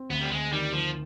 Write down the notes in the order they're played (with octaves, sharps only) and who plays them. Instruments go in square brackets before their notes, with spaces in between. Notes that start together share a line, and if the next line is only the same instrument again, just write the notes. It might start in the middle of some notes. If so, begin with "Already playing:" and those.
Already playing: [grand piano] C4
[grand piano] D2 [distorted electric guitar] B3
[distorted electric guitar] G3
[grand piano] D2 [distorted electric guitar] G#3
[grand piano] D#3 [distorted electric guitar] G3
[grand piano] D2 [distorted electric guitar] F3